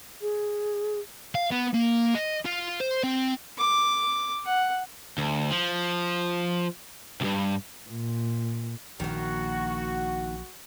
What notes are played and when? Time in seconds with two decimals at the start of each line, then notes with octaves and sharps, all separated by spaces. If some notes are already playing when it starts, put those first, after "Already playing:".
0.22 G#4
1.35 F5
1.51 B3
1.74 A#3
2.15 D#5
2.45 F4
2.80 C5
3.03 C4
3.58 D6
4.45 F#5
5.18 D2
5.51 F3
7.21 C#2 G2
7.89 A#2
9.00 A#1 D#3 A#3 F#4